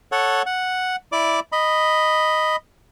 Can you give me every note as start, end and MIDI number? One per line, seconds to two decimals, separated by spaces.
0.12 0.42 69
0.12 0.42 73
0.12 0.42 78
0.46 0.96 78
1.12 1.40 64
1.12 1.40 74
1.12 1.40 86
1.52 2.56 75
1.52 2.56 83